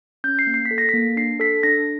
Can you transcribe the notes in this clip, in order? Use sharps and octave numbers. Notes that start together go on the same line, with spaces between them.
C#4 G6
C7
A#3
C7
B6
A4
A#6
A#3 B6
D4 C7
A4 B6
D4 A#6